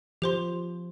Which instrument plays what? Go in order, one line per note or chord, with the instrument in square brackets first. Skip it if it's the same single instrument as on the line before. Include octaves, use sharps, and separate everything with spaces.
[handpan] F3 [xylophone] G4 C5 C6